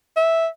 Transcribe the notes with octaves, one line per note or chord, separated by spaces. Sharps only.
E5